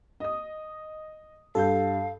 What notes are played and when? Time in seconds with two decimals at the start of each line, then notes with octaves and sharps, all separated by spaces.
0.20 D#5 D#6
1.55 G2 A4 F5 G6